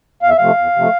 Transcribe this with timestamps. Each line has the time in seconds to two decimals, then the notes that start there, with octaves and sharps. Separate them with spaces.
0.22 E2 F5
0.29 E5
0.38 C3 F3 A3 F5
0.58 E2
0.76 C3 F3 A3